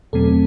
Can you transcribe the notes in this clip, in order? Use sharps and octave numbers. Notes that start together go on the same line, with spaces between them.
E2 B2 F#3 A3 C4 A4